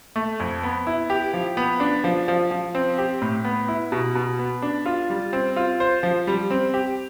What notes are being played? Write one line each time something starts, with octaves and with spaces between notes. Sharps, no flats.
A3
F2
B3
E4
G4
F3
B3
D4
F3
F3
F3
C4
G4
A2
B3
E4
B2
B2
B3
D4
F4
G3
C4
F4
C5
F3
G3
C4
G4